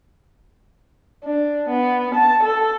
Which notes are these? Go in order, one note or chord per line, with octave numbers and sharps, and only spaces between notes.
D4
B3
A5
A4